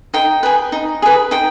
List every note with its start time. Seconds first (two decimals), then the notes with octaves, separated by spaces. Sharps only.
0.14 D#4 G5
0.43 G#4 B4
0.72 D#4
1.02 G#4 B4
1.31 D#4 G5